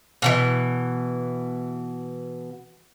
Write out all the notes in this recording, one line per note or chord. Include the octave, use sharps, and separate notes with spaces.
B2 D#3 E3